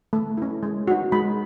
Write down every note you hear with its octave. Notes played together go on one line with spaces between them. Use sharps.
A3
C#4 E4
G#3
D#4 F#4
G#3 B5